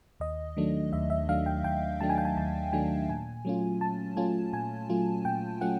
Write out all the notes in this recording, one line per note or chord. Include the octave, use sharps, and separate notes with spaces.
D#2 D#5
D#3 F#3 A3 D4
D#2 E5
E5
D#3 F#3 A3 D4 F5
G5
D#2 G5
D#3 F#3 A3 D4 A5
G#5
G5
G#5
D#2 A5
D#3 F#3 A3 D4 G#5
A#2 G#5
F#3 A3 C#4 F4
A#2 A5
F#3 A3 C#4 F4 G#5
A#2 G#5
F#3 A3 C#4 F4
A#2 G5
F#3 A3 C#4 F4 F#5